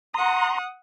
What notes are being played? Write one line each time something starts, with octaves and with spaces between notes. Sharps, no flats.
F#5 A#5 C6 D#6